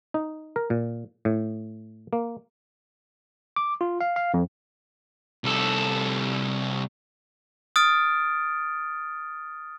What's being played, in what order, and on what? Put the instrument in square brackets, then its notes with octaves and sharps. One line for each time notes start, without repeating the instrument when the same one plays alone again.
[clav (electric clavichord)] D#4
A#4
A#2
A2
A#3
[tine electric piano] D6
F4
F5
F5
F2
[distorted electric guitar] C2 A4
[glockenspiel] D#6 F6 A6 D7